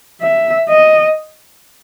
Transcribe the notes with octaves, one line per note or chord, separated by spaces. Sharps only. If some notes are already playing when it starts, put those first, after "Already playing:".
E5
D#5